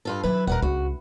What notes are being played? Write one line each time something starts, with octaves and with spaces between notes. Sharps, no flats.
G2 F4 A4
D#3 F#3 E4 B4
D#1 A#4 B4 F#5
C#2 F#4